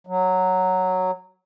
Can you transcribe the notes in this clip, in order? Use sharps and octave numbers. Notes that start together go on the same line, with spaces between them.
F#3